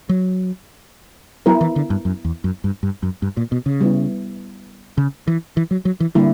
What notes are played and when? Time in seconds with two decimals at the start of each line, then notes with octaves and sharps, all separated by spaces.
0.09 F#3
1.46 F#3 B3 E4 A#4
1.61 E3
1.76 D3
1.90 G2
2.05 F#2
2.25 E2
2.44 F#2
2.64 G2
2.83 G2
3.03 F#2
3.22 G2
3.37 A#2
3.52 B2
3.66 C#3
3.81 G3 B3 E4
4.98 C#3
5.27 E3
5.57 E3
5.71 F#3
5.85 F#3
6.00 E3
6.15 D3 G3 A#3 E4